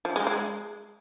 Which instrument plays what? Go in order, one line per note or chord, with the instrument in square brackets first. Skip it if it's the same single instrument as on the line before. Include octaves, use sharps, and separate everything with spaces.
[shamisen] F3
G#3
G#3